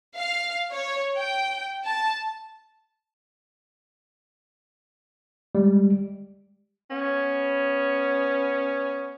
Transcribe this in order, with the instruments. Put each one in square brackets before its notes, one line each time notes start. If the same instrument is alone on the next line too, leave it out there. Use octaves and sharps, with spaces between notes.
[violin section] F5
C#5
G5
A5
[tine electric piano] G3 G#3
[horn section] B3 C#4